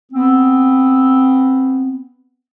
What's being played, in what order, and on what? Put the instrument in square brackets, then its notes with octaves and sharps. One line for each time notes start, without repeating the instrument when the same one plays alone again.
[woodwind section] B3 C4